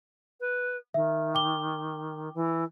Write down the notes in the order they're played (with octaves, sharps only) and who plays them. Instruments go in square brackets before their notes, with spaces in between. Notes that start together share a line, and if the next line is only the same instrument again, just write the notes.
[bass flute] B4
[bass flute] D#3 [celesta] E5
[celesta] G5 D6 G7
[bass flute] E3